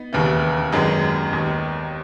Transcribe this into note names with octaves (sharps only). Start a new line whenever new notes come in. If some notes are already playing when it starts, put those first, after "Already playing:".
Already playing: B3 D#4
E1 D#2 C#3 E3
G#1 F#2 D#3 G#3 B3
D#2 D#3